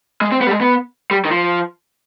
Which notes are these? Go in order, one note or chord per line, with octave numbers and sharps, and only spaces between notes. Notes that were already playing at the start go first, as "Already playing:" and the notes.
G#3
C4
B3
G3
G#3
B3
G3
D#3
F3